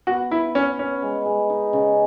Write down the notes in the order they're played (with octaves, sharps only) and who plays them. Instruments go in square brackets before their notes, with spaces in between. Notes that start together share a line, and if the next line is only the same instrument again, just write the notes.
[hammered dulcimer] B3 [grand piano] F#4
[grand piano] E4 [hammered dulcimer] B4
[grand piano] C#4 [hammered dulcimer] F#4
[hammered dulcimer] B3 [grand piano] C#4
[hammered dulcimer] G#3
G#3
D#4
C#3